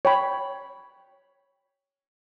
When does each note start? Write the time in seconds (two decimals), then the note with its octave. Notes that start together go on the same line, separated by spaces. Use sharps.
0.05 C#5 G5 B5